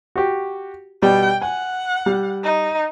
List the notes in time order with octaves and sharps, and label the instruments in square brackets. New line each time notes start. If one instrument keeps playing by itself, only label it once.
[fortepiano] F#4 G4
[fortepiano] B2 G3 D5 [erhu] G5
[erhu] F#5 [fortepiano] G#5
[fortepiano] G3
[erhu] D#4